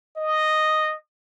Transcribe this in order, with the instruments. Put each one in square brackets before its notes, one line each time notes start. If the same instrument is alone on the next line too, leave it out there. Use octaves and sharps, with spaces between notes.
[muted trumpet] D#5